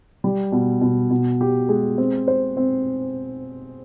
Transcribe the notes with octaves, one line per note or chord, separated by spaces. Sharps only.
G3
B2
B2
B2
G4
G#3
C4
C5
C4